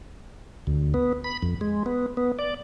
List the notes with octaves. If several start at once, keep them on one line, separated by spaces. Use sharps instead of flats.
D2
B3
B5
F2
G#3
B3
B3
D5